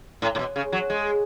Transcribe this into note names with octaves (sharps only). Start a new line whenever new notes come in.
A2
A2
B2
C#3
F#3
G#3